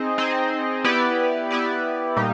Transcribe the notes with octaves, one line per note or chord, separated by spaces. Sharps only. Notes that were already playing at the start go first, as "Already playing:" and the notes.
Already playing: C4 D#4 G#4 C5 D#5
C4 D#4 G#4 C5 D#5
B3 E4 G4 B4 D5
B3 E4 G4 B4 D5
A#2 G3 A#3 D#4 G4